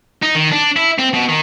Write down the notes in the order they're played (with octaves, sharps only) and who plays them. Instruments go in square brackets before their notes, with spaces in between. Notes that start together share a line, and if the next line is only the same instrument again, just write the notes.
[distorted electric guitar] D#4
D#3
D4
E4
C4
B2
D#3